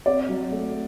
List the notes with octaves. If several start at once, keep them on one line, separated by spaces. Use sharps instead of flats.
C4 D5
F#3
A3